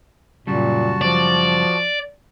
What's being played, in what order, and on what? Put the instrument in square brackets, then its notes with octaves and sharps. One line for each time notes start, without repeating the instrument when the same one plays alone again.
[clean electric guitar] F#2 C#3 G3 [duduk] A#2 [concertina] F#4 A5
[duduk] F3 [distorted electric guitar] D5